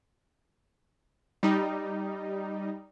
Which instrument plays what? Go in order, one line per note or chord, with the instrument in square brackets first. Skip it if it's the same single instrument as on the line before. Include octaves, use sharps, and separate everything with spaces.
[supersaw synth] G3 D#4